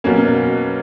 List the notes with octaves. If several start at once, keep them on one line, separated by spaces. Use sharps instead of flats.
B2 F#3 A#3 C#4